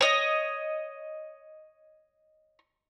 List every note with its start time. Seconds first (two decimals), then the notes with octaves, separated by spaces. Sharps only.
0.01 C#5 D#5